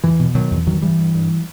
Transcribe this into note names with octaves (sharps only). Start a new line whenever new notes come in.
E2 E3
B2
B2 D#3 F#3
E2
G2 D#3 F#3
G2 E3 G3
G2
G2